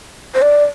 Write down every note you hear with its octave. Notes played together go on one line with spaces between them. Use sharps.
C5
D5